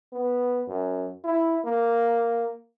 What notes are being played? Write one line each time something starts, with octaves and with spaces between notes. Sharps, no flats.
B3
F#2
E4
A#3